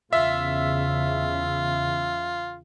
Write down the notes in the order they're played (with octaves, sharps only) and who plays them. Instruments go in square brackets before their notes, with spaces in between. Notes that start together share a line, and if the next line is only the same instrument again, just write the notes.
[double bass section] E2 C#3 [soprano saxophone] F4 [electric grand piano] E5